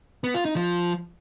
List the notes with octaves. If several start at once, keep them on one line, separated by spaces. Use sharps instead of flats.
B3
F4
D#4
F3